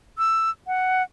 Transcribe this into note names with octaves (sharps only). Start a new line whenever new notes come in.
E6
F#5